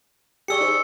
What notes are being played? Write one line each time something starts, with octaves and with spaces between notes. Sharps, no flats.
G4 G#4 D5 C#6 E6 C#7
D#4 G#4 C5